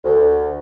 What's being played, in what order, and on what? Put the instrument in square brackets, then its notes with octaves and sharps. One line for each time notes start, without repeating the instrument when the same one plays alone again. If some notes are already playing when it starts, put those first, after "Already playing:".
[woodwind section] D2